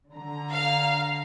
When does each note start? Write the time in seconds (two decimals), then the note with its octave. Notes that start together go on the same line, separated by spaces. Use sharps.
0.12 D3 A#5
0.52 F5